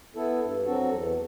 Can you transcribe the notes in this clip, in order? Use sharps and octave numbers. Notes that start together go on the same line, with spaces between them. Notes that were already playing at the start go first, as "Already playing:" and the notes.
B3 E4 A4
G2
F#3 C4 F#4 A4
E2